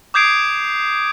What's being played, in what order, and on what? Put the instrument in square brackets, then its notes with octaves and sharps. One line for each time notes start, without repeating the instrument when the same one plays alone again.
[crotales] D6 D#6 G6 G#6 C7 D7